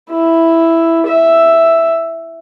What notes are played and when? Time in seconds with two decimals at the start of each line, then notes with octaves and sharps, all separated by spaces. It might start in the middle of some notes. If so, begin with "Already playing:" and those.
0.11 E4
1.07 E5